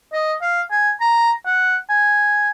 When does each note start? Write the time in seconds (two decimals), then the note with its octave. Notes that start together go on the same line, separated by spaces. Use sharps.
0.13 D#5
0.42 F5
0.71 G#5
1.01 A#5
1.45 F#5
1.89 G#5